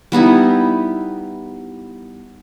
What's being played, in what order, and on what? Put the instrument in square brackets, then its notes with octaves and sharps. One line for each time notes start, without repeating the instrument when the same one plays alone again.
[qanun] G3 B3 D#4 E4